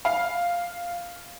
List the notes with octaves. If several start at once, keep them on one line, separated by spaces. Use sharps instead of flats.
F5